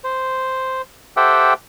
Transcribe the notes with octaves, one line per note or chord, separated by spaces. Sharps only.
C5
G4 A4 C5 E5 F#5 G5